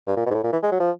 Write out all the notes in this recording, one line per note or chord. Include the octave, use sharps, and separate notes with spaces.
G2
A#2
B2
G#2
A2
A#2
E3
G#3
F#3
F3